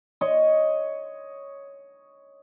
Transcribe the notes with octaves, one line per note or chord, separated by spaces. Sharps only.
C#5 D#5